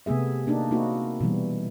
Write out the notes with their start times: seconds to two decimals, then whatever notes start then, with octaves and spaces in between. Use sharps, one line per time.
0.06 C3 A3 B3 G#4 E5
0.47 A#3 D4 D#4 G4
0.71 A#3 C4 D#4 E4 F#4
1.20 B2 E3 G3